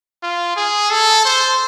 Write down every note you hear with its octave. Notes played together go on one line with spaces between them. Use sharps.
F4
G#4
A4
C5